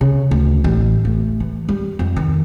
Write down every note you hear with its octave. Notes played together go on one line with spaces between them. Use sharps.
C#3
D2
A1
A3
E3
G3
F2
D#3